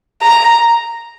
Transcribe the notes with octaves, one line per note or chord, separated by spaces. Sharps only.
A#5